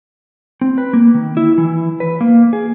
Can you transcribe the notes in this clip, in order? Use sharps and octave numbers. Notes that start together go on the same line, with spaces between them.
C4
B4
A#3
D#3
E4
E3
B4
A#3
G#4